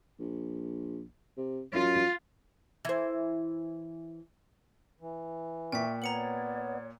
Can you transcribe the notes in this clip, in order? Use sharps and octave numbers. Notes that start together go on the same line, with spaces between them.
A#1
C3
F#2 F4
E3 C5
E3
A#2 E5 G5 C#6 B6
B3 C#5 D5 A#5 C#7 F#7